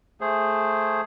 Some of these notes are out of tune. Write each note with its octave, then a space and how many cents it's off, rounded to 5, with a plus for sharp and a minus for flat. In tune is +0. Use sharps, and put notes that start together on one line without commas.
A3 +0 G#4 +0 C5 +5